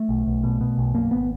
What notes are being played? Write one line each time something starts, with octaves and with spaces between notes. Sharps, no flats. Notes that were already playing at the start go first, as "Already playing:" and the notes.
Already playing: A3
B1
B1
B2
B2
B1
F#2 A#3
G#1 B3